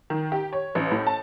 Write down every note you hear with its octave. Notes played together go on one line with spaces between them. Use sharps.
D#3
G4
C#5
A1
A2
A5